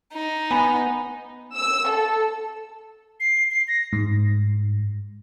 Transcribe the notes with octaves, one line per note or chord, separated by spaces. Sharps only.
D#4
B3 G#5 B5
E6
A4
C7
C7
A#6
G#2